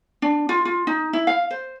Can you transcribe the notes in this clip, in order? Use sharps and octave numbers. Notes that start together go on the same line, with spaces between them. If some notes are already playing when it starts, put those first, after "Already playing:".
D4
F4
F4
D#4
E4
F5
C5